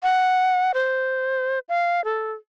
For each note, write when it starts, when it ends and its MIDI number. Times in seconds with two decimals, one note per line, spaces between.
0.03 0.72 78
0.74 1.59 72
1.69 2.04 77
2.05 2.33 69